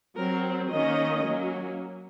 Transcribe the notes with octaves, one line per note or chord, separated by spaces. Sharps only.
F#3 C4 A#4
D#3 A#3 C#4 D#5
F#3 A#3 C#4